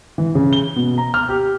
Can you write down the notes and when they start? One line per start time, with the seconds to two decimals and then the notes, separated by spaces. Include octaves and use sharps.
0.18 E3
0.35 C#3
0.53 G7
0.76 B2
0.98 A#5
1.14 F6
1.29 G4